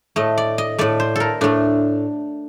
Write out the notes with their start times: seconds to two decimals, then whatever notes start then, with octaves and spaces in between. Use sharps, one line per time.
0.16 A2 A3 D#5
0.38 D5
0.58 D#5
0.78 A2 A3 D5
1.00 C5
1.16 A4 A#4
1.41 A2 A3 D4